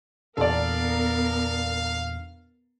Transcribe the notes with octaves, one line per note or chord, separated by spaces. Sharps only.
E2 A#2 B3 D4 A4 A#4 D5 F5